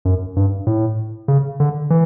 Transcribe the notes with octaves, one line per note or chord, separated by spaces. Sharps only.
F#2
G2
A2
C#3
D3
E3